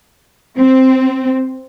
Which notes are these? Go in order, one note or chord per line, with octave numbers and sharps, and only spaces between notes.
C4